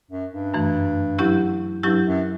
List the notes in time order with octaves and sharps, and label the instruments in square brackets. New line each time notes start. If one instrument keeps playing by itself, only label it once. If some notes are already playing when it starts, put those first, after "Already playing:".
[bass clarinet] F#2
G2
[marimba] F#2 E3 A3
F#3 C#4 E4 G4
[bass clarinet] G2 [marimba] F#3 C#4 E4 G4
[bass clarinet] F#2